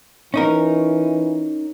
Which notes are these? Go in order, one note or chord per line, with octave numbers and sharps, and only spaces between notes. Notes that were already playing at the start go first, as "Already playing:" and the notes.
E3 C#4 D#4 A#4